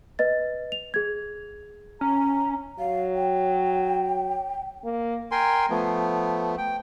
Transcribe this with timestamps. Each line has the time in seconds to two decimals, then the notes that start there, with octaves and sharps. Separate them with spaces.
0.19 B4 D#5 A6
0.72 F7
0.94 G#4 G#6
2.01 C#4 A#5
2.79 F#3 F5
3.15 G5
4.84 A#3
5.31 A#4 G5 G#5 C6
5.70 F3 A3 B3
6.58 G5